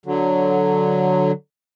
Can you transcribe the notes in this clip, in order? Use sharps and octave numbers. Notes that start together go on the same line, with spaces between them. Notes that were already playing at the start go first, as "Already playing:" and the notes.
D3 F#3